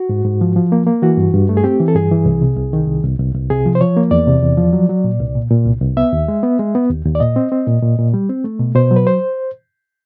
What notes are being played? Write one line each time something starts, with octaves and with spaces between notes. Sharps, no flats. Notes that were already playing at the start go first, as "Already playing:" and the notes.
Already playing: F#4
G#2
G#2
F3
F3
A#3
A#3
E3 F#4
G2
G2
A3
G#4
C4 G4
E3
A4
G2 G#4
E3
C2
C3
C2
D#3
C2
C2
C2
C2
C3 G#4
F3
C5
F3 C#5
A#3
E2 D5
C3
E2
F3
F#3
F#3
A#2
C2
A#2
A#2
C2
C2
B3 E5
D#2
G#3
B3
G#3
B3
D#2
D#2
D5
A#2 D#5
C4
C4
A#2
A#2
A#2
G3
C4
A3
B2
B2 C5
F#3
B4
C5